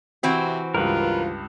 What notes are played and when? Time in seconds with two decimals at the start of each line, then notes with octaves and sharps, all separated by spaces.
0.23 C3 E3 C4 F#4
0.74 C#2 G2 F4 A#4 B4